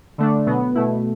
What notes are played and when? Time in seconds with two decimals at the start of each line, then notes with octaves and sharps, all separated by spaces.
0.18 D3 A3 D4
0.46 B2 F#3 B3
0.75 B2 A3 E4